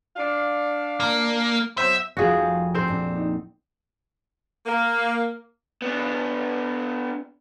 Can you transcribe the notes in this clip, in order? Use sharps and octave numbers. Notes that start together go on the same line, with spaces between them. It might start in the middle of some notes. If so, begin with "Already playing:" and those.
D4 F5
A#3
F#3 B3 C5 E5
F1 G3 F4 F#4 G#4 G#5
G5
C4 C5
A#2 D4
D#4
A#3
B3 D4